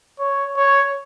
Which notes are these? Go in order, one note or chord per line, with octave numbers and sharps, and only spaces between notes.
C#5
C#5